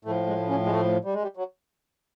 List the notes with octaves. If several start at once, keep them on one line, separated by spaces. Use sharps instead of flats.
A2 F3 A3
G#3
C#4
G#3
A3
G3
G#3
G3
F#3